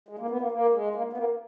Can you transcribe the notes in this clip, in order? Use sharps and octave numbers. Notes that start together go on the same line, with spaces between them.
G#3
A#3
B3
A#3
A#3
G#3
A#3
B3
A#3